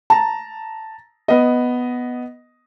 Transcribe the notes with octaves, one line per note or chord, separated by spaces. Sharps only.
A5 A#5
B3 D#5